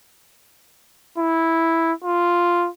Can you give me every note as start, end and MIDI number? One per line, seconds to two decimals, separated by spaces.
1.18 1.92 64
2.04 2.68 65